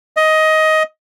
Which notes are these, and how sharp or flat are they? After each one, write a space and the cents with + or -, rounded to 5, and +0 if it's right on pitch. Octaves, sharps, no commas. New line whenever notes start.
D#5 +15